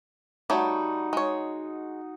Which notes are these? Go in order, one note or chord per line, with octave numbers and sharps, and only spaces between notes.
G3 A3 D#4 F#4 C#5
G#3 C#5